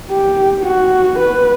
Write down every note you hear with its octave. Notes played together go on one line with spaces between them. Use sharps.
G4
F#4
B4